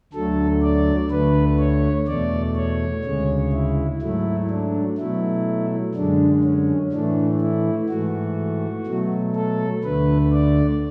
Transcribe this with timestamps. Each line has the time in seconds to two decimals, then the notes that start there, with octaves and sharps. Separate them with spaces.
0.13 D2 D3 F#3 A3 A4
0.62 D5
1.10 D2 D3 A3 B4
1.59 C#5
2.07 E2 B2 A3 D5
2.56 C#5
3.04 D2 C#3 G#3
3.53 E4
4.02 G#2 F#3 A3 E4
4.50 D4
4.98 B2 F#3 A3 E4
5.95 F#2 D3 G#3 D4
6.44 C#4
6.92 A2 E3 A3 D4
7.41 E4
7.89 G#2 E3 A3 F#4
8.87 B2 F#3 A3
9.35 A4
9.84 D2 D3 A3 B4
10.32 D5